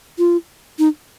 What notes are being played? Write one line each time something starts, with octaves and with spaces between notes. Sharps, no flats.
F4
D#4